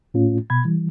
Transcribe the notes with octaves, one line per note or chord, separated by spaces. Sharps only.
A2 A3 C#4 F4
B2 B5 G#6
E3 G3